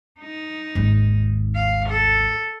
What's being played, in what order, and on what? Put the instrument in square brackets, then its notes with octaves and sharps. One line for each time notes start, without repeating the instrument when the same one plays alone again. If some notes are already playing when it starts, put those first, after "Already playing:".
[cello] D#4
[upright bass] G#1 D#2
[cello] F5
A4